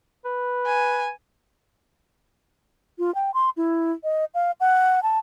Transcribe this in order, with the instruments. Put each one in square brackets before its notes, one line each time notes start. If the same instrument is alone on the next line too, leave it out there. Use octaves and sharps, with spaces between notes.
[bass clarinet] B4
[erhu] G#5
[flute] F4
G5
C6
E4
D#5
F5
F#5
A5